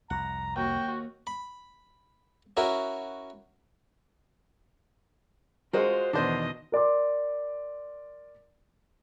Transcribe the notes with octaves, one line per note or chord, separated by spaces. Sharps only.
C2 F2 F#5 A#5
D#2 F#4 G5
B5
C#4 E4 F#4 A#4 E5
G#3 F4 F#4 A#4 C5 D#5
E2 B2 D#3 D4 C5 D#5
A#4 D5 C6 D6